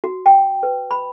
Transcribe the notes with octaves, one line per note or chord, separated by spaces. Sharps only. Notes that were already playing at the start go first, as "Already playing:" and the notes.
F#4
G5
B4
B5